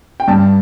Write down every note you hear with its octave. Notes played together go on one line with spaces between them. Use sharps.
G5
G2 A5